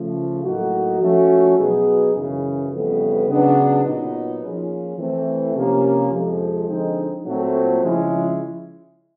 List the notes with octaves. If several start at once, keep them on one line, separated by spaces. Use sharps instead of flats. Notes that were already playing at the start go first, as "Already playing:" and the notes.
Already playing: C#3 F3 A3
A2 F#3 A#3 D#4 F#4
F3 A3 C#4 F#4
B2 F#3 B3 D#4 G#4
F#2 C#3 E3
F2 C#3 E3 G3 B3
C#3 F#3 B3 D4
A#2 F#3 B3 D#4
F3 A#3 C#4 F4 G#4
E3 A3 C4
C3 F3 A#3 C#4
F2 C3 F3 G#3
D3 F3 G#3 C4 D#4
A#2 F#3 A3 C4
C#3 F3 G#3 C#4 E4